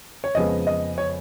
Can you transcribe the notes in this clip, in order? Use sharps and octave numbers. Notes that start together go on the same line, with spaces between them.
C#5
F2 C#3 F3 G#3 B3 D#5
D#5
C#5